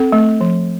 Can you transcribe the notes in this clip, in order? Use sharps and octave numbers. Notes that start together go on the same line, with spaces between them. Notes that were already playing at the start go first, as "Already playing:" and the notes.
Already playing: C4 A4
A3
F3